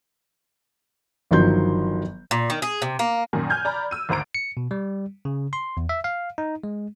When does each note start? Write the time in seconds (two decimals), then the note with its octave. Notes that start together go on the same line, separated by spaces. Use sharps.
1.31 G1 D#3 F3 F#3 C6 G6
2.31 A#2
2.50 D#3
2.62 G#4
2.82 C3
2.99 A#3
3.33 F#2 A#2 D#3 G#5
3.50 G#5 F6 G6 G#6
3.65 D5 A#5 B5
3.91 E6 D#7
4.09 G#1 D2 C5 A#5 D7
4.35 C#7
4.57 B2
4.71 G3
5.25 C#3
5.53 C6
5.77 E2
5.89 E5
6.04 F5
6.38 D#4
6.64 G#3